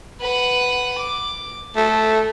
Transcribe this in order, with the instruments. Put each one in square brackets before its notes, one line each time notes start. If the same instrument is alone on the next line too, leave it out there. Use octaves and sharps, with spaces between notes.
[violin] B4 F#5
D6
[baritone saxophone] A3 [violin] A4